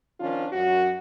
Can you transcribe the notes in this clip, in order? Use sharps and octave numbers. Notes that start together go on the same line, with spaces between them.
D#3 F3 C#4 D4 F4
F#2 F#4